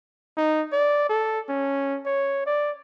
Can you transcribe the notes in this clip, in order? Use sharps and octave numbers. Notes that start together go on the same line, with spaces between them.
D#4
D5
A4
C#4
C#5
D5